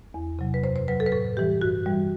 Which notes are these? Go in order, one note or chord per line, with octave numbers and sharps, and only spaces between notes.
E2
C3 F#3
B4
F#2 C5
C5
F#3 B4
A4
B4
A2 A4
E3 G3 G4
G2 F#4
E3 G3